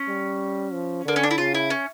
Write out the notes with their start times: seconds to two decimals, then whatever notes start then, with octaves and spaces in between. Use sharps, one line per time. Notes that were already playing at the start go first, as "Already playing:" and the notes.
Already playing: C#4
0.08 G3
0.73 F3
1.05 D3 A#3
1.16 C#4
1.23 D4
1.31 E4
1.38 C#3 F4
1.55 E4
1.70 C#4